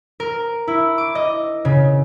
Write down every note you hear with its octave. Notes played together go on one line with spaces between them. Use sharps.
A#4
E4
D6
D#5
C#3